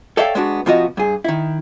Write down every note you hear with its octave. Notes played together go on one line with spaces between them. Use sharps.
A4 C#5 D5 E5 F5 G5
G#3 B3 D4 F#4
C3 F3 B3 F4 F#4 D#5
G2 G#4
D#3 E4